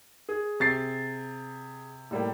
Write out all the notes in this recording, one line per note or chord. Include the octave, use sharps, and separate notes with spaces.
G#4
C3 A6 C7
A2 G3 A#3